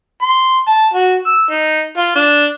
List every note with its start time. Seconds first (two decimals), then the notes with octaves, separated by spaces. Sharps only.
0.22 C6
0.68 A5
0.94 F#4
1.26 E6
1.51 D#4
1.98 F4
2.16 D4